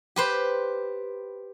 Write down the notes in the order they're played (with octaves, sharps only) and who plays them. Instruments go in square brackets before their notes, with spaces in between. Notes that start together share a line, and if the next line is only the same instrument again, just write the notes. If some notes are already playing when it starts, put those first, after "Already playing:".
[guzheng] G4 B4 C5